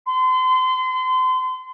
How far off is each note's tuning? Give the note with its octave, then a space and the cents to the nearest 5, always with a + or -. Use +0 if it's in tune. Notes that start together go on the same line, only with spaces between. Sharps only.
C6 -35